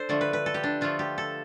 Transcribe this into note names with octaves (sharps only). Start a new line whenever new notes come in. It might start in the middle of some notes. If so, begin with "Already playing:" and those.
Already playing: D4 A4 C5
D3 F3 A3 D5
B4
B4
A4
G4
D4
D3 F3 A3 F4
G4
A4